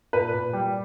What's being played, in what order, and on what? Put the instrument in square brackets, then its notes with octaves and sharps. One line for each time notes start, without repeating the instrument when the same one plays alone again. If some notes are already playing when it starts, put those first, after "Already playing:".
[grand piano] A#2 B4
A#2
G3